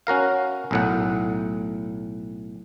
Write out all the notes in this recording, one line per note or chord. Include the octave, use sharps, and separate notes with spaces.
C#4 F#4 A#4 F5
B1 A2 F#5